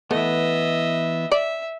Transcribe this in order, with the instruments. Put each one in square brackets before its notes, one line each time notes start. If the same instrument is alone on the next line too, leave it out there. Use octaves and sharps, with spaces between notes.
[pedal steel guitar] E3 B3 [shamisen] A3 [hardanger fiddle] D#5 E5
[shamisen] D5 [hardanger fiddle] E5